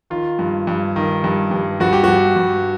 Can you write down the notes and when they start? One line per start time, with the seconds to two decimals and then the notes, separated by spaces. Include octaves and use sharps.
0.10 D#3 F4
0.39 G2
0.67 G2
0.96 D#3
1.24 G2
1.51 G2
1.80 G2 F#4
1.93 G4
2.04 G2 F#4
2.36 G2